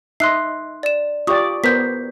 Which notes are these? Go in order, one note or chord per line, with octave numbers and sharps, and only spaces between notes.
D#4 D#5 E5 C6 F#6 C7
D5 E7
F4 G4 D5 C#6 D#6
B3 A#4 C5 G6 B6